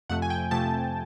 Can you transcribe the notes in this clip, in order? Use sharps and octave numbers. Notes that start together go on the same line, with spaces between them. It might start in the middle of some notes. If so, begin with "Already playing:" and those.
F2 C3 F3 A3 F#5
G#5
G5
C3 F3 A3 A5